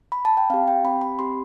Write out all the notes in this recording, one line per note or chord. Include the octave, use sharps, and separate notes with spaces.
B5
A5
G5
C4 G4 F5
G5
C4 G4 B5
B5
C4 G4 C6